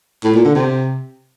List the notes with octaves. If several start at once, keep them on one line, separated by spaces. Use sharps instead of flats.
A2
A#2
D3
C3